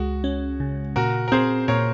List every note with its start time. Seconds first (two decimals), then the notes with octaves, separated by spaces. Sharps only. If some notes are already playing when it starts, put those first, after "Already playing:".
Already playing: C#2 G#3 F#4
0.24 C#4
0.60 C#3
0.96 A#2 F#4 A#4
1.28 A#4
1.32 C4 G#4 C5
1.68 A#2 A#4 C#5